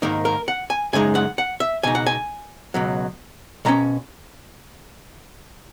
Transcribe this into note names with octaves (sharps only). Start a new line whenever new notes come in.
G#2 D#3 A#3 D#4 A#4
A#4
F#5
G#5
F#2 C#3 G#3 D#4 G#5
F#5
F#5
E5
C#2 B2 D#4 G#5
F#5
G#5
C#2 B2 F#3
B2 G#3 C#4 A#5